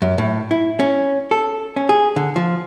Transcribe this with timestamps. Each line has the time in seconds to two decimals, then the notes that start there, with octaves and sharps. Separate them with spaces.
0.02 F#2
0.18 A2
0.51 E4
0.80 C#4
1.31 A4
1.76 C#4
1.89 G#4
2.16 D3
2.36 F3